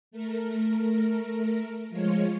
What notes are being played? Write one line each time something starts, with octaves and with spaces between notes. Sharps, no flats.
A3 A#4
F3 G#3 F4 C#5